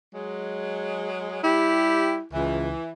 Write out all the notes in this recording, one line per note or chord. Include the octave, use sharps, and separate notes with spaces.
F#3 G#3
G3 E4 G4
C#2 E3